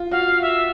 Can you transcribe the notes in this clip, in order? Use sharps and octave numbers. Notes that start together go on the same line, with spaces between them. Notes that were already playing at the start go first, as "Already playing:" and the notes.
Already playing: F4
F#4 F5
E5